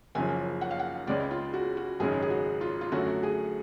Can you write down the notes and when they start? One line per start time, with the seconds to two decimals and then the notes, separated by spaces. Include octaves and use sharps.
0.15 F#1 F#2 C#3 F3 G#5
0.61 F#5
0.71 F5
0.79 F#5
1.07 C#2 C#3 G#3 C#4 D5
1.31 F4
1.54 F#4
1.77 F#4
2.00 G#1 F#2 C#3 G#3 C#4 G#4
2.22 G#4
2.30 F#4
2.61 F4
2.81 F4
2.92 F#2 D3 F#3 A3 C#4 F#4
3.23 G#4